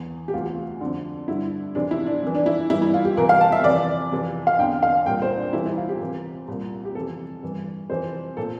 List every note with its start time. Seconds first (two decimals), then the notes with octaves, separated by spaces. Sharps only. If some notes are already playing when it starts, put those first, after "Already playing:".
Already playing: E2 E3
0.28 G4
0.33 D2 C3 E3 F4
0.81 F2 D3
1.28 G2 D3 E4
1.75 F2 C3 E3 D4
1.91 E4
2.06 D4
2.23 F2 E3
2.35 D4
2.46 E4
2.70 G2 E3 E4
2.82 E4
2.94 F4
3.05 G4
3.17 C2 C3 E3 A#4
3.29 F5
3.41 A5
3.52 E5
3.64 F2 C3 E3 D5
4.11 F2 C3 E3
4.47 F5
4.59 E2 D3 G5
4.83 F5
5.06 C2 A#2 G5
5.22 C5
5.37 D4
5.53 C2 C3 E3 E4
5.65 E4
5.77 F4
5.89 G4
6.01 C2 C3 E3
6.48 C2 A#2
6.85 G4
6.95 F2 C3 E3 A4
7.42 G2 E3
7.90 F2 C3 E3 C5
8.37 A#2 A4